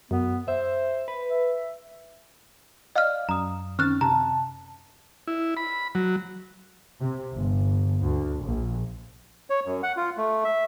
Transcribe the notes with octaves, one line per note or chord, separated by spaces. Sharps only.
F#2 B3
C5 E5
B4
E5
D5 D#5 F5 F6
F#2 A#5 D#6
D#3 C4 C#4 F6 F#6 A6
C3 A5 A#5
E4
B5
F#3
C3
G1
D2
A#1
C#5
F#2
F#5
F4
A3
E5